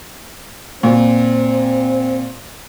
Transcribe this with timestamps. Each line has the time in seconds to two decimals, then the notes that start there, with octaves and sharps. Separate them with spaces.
0.83 A#2 C4